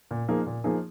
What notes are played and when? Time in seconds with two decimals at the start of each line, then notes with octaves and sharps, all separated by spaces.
0.11 A#2
0.28 F3 A#3 D#4 G#4
0.46 A#2
0.64 F3 A#3 D#4 G#4